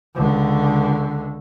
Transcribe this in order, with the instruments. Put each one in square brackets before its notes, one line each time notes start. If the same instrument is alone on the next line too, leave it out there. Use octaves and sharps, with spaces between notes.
[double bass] C#2 D3